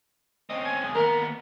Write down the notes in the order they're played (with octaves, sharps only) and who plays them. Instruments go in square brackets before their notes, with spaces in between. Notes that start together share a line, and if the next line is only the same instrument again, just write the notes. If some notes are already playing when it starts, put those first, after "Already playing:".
[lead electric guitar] C4 C#4 [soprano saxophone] D#5
[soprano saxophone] G#5
[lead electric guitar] B1 G#4
[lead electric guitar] D#2 B3 [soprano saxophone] A#4